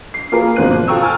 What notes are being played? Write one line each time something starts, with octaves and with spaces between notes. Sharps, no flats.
C7
A#3 F4 G#4 A#4 B4
G#1 B2 A#3 C5 F#6 D#7
F3
F4 A4 G5 A#5 C#6 E6
G#5 A5 F6